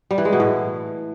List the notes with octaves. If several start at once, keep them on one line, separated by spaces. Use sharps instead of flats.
G3
E3
G#3
B2
A2